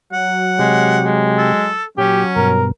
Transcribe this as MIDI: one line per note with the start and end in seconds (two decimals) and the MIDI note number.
0.13 1.78 54
0.13 1.14 78
0.59 1.53 48
0.59 0.98 56
0.59 1.53 67
1.04 1.69 56
1.38 1.84 69
1.98 2.25 46
1.98 2.63 54
1.98 2.54 61
1.98 2.23 67
2.36 2.71 43
2.36 2.71 47
2.36 2.66 70